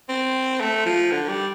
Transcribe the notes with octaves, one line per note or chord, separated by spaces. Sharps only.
C4
A3
F3
D3
G3